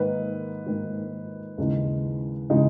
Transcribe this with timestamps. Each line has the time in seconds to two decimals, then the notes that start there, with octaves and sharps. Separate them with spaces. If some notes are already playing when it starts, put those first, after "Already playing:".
Already playing: G#2 D#3 A#3 B4
0.67 G#2 D#3 A#3
1.58 D#2 C#3 E3 G#3 D#4
2.50 C#3 E3 G#3 D#4